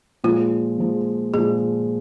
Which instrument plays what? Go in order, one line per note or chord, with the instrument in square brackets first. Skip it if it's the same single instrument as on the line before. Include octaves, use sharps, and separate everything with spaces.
[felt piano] A#2 F3 G#3 [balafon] F4
[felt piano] A#2 F3 G#3
[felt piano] A#2 F3 G#3 [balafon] G#4